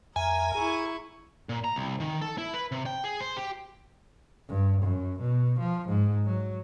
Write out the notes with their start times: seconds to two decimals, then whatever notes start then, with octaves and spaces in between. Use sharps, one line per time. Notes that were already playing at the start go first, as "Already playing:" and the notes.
0.16 F2 A#4 E5 G#5
0.55 E4 G#4 C#6
1.49 A#2
1.64 A#5
1.76 C2
2.00 D#3
2.22 A4
2.38 E4
2.54 B4
2.72 C3
2.86 G5
3.04 G#4
3.21 C5
3.37 G4
4.49 G2
4.83 F#2
5.20 B2
5.60 F3
5.89 G#2
6.26 F#3